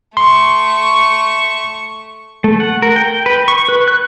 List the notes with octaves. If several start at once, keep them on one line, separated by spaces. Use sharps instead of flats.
A3 C6 C#6
A3
F#5
A#4
G5
B4
C#6
B4
F#6